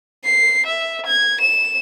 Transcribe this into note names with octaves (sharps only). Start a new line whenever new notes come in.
C7
E5
G#6
E7